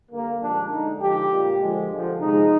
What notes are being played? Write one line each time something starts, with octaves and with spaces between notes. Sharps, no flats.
D3 G3 A#3
A#2 F3 G#3 D4
D3 G#3 D#4
D3 F3 G#3 G4
A#2 G3
D3 F3 G#3
D3 F3 G#3
C3 F3 G#3 D#4